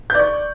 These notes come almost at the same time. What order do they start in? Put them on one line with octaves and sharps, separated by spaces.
G6 D5 C#6